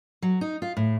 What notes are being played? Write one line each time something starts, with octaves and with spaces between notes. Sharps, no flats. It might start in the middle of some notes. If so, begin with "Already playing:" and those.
F#3
D#4
F4
A2